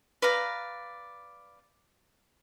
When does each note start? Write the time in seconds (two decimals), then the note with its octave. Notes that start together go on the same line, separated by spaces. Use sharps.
0.22 B4 D5 F5 A#5